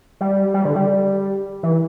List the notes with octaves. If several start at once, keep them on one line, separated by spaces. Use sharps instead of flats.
G3
G3
D3
G3
E3